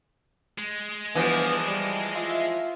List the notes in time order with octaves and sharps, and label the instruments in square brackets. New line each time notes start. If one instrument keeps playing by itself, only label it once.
[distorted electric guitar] G#3
[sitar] E3 F3 [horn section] G3 B3 D4
[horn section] G3
F4 E5